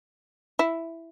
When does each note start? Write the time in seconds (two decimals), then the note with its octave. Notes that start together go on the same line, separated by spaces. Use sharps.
0.59 E4